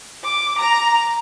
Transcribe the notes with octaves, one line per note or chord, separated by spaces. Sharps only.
D6
A#5